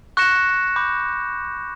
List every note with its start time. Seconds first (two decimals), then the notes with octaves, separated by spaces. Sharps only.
0.17 C#6 F#6 A#6 C#7 E7
0.76 B5 D6 G6